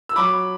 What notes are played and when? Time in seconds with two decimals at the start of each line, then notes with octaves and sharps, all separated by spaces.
0.09 E6
0.16 F#3 B5 D6